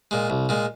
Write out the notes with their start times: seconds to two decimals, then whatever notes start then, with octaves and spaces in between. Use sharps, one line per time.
0.11 A#2 G#3
0.30 C2
0.49 A#2 G#3